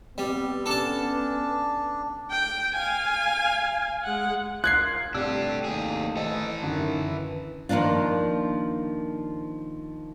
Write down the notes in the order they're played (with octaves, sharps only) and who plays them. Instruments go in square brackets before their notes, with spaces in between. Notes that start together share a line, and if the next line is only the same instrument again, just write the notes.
[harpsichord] G3 [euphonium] B3 [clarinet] C4
[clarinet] C#4 [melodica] D4 [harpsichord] A4 A5
[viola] G5
F5 G#5
G#3 F#5
[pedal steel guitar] F4 A#4 [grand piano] F#6 G#6 C7
[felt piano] C2 [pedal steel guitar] A3 D5 E6 [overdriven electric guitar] D4 G4
[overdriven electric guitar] D#2 G#4
[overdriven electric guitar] E3 A4 [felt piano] D#5
[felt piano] F#2 D3 [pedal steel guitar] D#3
[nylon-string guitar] D#3 F3 A#3 D4 F4